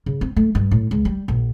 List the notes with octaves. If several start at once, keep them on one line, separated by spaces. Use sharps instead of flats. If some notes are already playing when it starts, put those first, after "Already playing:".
C#3
C4
A3
G2
A2
C#2
G3
A#1